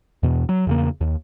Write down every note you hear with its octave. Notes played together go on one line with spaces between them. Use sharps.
E2 B2
F#3
E2 C#3 A#3
D#2